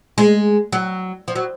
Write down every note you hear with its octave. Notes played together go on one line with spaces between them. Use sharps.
G#3
F#3
F3
F#3